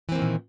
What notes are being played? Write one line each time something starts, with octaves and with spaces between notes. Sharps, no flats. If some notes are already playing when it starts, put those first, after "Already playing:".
A#2 D#3 E3 A#3 C4